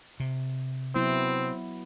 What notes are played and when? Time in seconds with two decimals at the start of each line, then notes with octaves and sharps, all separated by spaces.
0.20 C3
0.95 F#3 B3 C4 E4